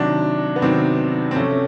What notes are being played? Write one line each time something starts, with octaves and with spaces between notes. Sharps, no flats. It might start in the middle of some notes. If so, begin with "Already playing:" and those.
Already playing: C3 D#3 F#3 D4
B3
C3 D#3 F#3 C4
C4
C3 F3 A3 C#4